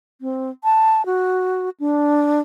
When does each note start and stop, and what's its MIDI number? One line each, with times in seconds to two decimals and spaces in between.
0.21 0.50 60
0.64 1.05 81
1.06 1.70 66
1.80 2.41 62